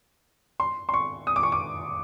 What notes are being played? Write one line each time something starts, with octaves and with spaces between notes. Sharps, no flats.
C6
C6
C#6
D#6
D6
C#6
D6